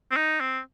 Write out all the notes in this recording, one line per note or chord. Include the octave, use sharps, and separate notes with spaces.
C4
D#4
C4